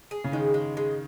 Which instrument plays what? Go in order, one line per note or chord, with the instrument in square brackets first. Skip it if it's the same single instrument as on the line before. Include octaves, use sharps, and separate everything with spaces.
[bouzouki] G#4
[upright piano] C#3
[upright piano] D#3 [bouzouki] G#3
[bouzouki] G#3
G#3